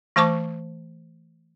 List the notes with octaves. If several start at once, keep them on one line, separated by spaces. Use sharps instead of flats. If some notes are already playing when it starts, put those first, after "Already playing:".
E3 A3 C5 A5 C#6 D6